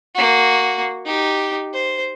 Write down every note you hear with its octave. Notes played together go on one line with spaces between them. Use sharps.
A#3 F#4
D#4 G4
C5